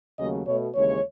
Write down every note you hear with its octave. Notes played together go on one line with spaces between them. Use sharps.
D#2 C#3 F#3 A3 D#5
B2 A3 C#5
D#2 C#3 E3 G#3 C#5